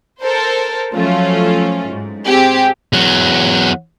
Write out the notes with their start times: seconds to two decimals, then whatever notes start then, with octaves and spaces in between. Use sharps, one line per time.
0.20 A4 A#4 C5
0.95 F3 F#3 A3 C#4 F4
1.87 G#2
2.25 C4 G4 G#4
2.93 E2 F#3